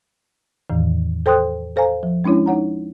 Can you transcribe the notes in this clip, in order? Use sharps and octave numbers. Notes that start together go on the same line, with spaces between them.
E2 A2 D#3 E3
A4 C5 G5 C6 D#6 F#6
A4 C5 F5 G#5 A#5
F3
G#3 C#4 D4 E4 C#5
D#4 C#5 F#5 A#5